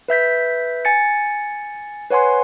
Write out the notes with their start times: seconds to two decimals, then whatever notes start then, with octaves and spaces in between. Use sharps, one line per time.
0.08 B4 E5 G6 B6
0.85 G#5 A6 C#7
2.10 B4 C#5 F#5 G#5 C6